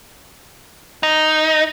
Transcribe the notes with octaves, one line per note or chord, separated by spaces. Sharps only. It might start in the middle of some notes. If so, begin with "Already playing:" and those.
D#4